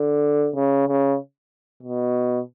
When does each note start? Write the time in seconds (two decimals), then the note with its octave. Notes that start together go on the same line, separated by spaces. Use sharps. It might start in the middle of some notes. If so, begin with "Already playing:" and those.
Already playing: D3
0.55 C#3
0.88 C#3
1.83 B2